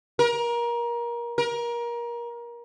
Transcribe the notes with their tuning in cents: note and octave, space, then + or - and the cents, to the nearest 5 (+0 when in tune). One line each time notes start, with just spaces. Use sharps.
A#4 +25
A#4 +25